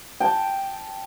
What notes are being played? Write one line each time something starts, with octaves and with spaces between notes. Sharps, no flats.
G5 A5